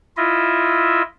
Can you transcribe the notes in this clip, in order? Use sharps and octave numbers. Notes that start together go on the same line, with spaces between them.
E4 F4 D#5 E5